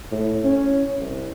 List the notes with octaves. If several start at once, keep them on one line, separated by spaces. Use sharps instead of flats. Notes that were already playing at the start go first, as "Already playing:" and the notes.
A2
C#4
C2